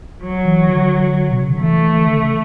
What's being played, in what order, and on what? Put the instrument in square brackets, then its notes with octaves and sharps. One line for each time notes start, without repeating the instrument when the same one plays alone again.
[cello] F#3
[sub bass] E3
D3
B2
C#3
D3
[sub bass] E3 [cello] A3
[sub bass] D3
C#3